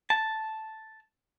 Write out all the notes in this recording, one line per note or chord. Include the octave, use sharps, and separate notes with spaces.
A5